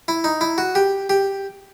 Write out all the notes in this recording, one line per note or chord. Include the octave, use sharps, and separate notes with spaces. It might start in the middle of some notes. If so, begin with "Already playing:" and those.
E4
D#4
E4
F#4
G4
G4